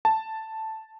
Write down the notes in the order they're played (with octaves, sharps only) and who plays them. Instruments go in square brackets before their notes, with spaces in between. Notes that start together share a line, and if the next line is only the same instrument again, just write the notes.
[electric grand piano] A5